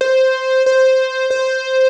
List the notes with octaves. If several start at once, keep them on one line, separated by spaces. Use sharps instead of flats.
C5
C5
C5